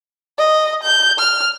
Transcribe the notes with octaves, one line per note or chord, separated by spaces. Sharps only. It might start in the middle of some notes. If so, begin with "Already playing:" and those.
D#5
G6
F6